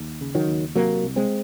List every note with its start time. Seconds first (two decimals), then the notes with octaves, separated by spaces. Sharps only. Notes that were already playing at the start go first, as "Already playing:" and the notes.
Already playing: D#2
0.21 C#3
0.35 D#3 F#3
0.48 D#2
0.75 C3 F#3 A#3
1.04 C2
1.16 G#3 C4